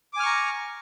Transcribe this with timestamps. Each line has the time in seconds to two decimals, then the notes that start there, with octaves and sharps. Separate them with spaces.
0.13 D6
0.16 G#5
0.20 F6
0.23 C#6
0.26 A#5